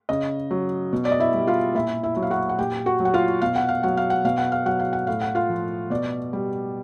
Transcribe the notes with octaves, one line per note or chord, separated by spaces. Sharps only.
C#3 D#5
F#3
B2
D5
D#5
E4 E5
G3
F4 F5
A#2 E4 E5
E4 E5
F#3 E5
F5
F#4 F#5
F#5
A#2 G4 G5
F#4 F#5
F#3
F#5
F4 F5
B2 F5
F#5
F5
F#3 F#5
F5
F#5
B2 F5
F#5
F5
F#3 F#5
F5
F#5
A2 F5
F#5
F4 F5
F3
B2 D5
G3